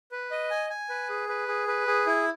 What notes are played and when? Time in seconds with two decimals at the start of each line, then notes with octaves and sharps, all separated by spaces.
0.12 B4
0.31 D#5
0.51 G#5
0.70 G#5
0.89 B4
1.09 G#4
1.29 B4
1.48 G#4
1.68 B4
1.87 G#4
2.07 E4